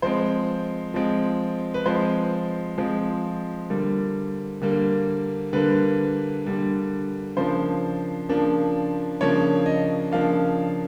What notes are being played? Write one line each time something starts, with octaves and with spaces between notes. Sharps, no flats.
F3 G#3 C4 C5
F3 G#3 C4
B4
F3 G#3 C4 C5
F3 G#3 C4
D3 G3 A#3
D3 G3 A#3
D3 G3 A#3 B4
D3 G3 A#3
C#3 F3 A#3 D4 C5
C#3 F3 A#3 D4
C#3 F3 A#3 D4 C#5
D#5
C#3 F3 A#3 D4 F5